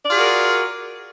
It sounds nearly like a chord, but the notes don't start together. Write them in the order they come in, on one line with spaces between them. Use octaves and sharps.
D5 F4 G#4 F#4 A#4